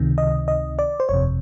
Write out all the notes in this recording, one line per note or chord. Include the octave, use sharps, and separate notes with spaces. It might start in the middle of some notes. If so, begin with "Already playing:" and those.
Already playing: C#2 C3 D#3
D#5
D#5
D5
C5
G1 F2 C3 C#5